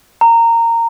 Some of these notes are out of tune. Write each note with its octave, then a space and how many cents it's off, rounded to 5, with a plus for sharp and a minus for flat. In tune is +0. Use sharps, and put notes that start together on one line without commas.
A#5 -15